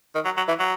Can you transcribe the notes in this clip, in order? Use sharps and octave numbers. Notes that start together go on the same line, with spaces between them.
D#3
F#3
F#3
E3
F#3